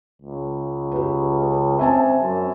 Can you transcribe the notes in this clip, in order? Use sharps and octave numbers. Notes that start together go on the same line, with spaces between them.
C#2
G4 B4
C4 E5 G#5 A5
F#2